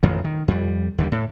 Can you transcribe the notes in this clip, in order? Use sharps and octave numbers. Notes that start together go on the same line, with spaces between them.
A1 F2 D#3
D#3
F2 G3
D#2 D3 G3
A2